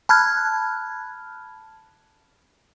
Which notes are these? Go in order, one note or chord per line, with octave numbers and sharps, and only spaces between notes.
A5 B5 F6 F#6 G#6